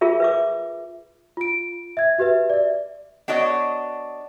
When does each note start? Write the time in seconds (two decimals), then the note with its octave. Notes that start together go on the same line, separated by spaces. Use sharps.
0.01 F4 G#4 A#4 E5
0.20 B4 E5 D6
1.37 F4 D7
1.97 E5 G#6
2.18 F#4 G4 B4 E5
2.50 D5 E5
3.28 B3 D4 F#4 C#5 D#5